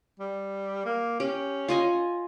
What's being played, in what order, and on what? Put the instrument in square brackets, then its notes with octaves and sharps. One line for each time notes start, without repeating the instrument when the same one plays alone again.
[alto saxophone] G3
A#3
[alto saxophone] C#4 [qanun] G4
[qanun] F4 D#5 G#5